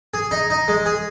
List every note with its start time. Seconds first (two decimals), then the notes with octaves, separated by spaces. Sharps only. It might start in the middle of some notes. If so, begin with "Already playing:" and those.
0.14 G#4
0.31 D#4
0.50 D#4
0.68 G#3
0.86 G#4